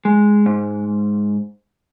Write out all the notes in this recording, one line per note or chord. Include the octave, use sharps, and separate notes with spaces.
G#3
G#2